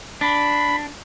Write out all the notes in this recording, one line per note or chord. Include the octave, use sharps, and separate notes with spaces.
D4 B5